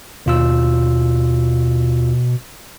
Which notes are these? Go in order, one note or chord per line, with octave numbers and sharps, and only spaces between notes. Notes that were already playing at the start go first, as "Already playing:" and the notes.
D#2 B2 F4 E6